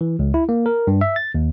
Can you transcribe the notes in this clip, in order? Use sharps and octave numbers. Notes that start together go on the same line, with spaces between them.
E3
C#2
E4
A#3
A#4
G2
E5
A6
D#2